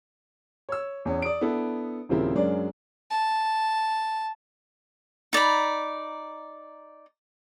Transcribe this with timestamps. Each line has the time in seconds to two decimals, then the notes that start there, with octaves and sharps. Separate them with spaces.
0.69 C#5 E6
1.05 E2 C#4
1.22 D5 D#6 D7
1.41 B3 D4 E4 A4
2.09 D#1 C#3 F3 C4 E4 A#4
2.35 F#2 F#3 G#3 D4 A#4 D5
3.10 A5
5.33 D#4 D5 A#5 B5